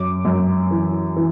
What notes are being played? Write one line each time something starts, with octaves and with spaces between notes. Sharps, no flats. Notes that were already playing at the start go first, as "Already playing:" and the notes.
Already playing: F#2 D6
F#2
E3
E3